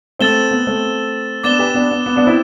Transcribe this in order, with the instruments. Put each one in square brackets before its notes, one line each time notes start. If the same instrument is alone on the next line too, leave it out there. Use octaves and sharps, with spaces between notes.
[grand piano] A3 C4 [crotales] E6 A6 E7 G7
[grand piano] B3
A3 C4
[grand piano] B3 D4 [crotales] D6 A6 E7 G7
[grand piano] G4 B4
B3 D4
B3
B3
B3 D4
C4 E4